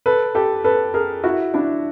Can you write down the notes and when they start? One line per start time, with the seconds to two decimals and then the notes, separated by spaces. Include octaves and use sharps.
0.06 A4 B4
0.35 G4 A4
0.64 A4 B4
0.94 G#4 A#4
1.23 E4 F#4
1.54 D4 E4